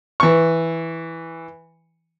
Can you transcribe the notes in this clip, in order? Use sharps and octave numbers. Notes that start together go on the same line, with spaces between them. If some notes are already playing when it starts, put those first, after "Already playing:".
E3 C#6